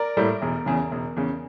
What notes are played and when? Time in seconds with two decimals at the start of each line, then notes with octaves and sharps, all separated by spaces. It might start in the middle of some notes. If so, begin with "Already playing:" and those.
Already playing: A#4 D5
0.16 A2 G3 A#3
0.42 E1
0.66 E2 C#3
0.91 E1
1.16 E2 C#3